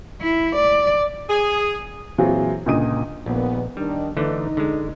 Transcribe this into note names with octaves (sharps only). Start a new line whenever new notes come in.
E4
D5
G#4
A#2 E3 F#3 C4 F4 G#4
C#2 A#2 D3 D#5 D#6 D#7
A#1 D#2 A#2 B3
D#3 G3 D4
D3 E3 A3 D#4
D3 G#3